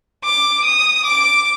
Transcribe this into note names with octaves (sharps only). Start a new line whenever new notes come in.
D6
D#6
D6